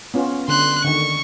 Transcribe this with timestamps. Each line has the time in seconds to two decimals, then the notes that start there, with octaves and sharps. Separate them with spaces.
0.14 B3 C#4 F4
0.48 D3 C6 F#6
0.84 D3 D#3 C#6